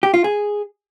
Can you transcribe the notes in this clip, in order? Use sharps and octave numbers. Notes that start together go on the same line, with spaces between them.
G4
F4
G#4